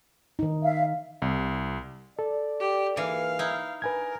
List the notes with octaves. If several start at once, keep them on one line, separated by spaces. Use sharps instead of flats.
D#3 D#4
E5 F5
C2
A4 D5
G4
G#2 E3 G#3 A#3 F5
D#4 E4
D4 A#4 B4 G#5 G#6